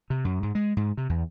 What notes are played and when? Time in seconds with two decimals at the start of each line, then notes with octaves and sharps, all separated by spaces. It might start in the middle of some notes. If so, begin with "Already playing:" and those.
0.10 C3
0.25 F#2
0.43 G#2
0.55 G#3
0.77 G#2
0.97 C3
1.09 E2